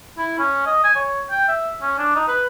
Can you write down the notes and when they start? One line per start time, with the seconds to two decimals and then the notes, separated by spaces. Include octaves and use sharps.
0.18 E4
0.38 C#4
0.66 D#5
0.84 G#5
0.96 C#5
1.30 G5
1.48 E5
1.82 C#4
1.98 D4
2.15 D#4
2.28 B4